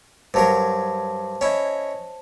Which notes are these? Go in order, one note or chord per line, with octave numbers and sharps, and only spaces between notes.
G2 F#3 A#4 C5 A5
C#4 E4 C#5 D#5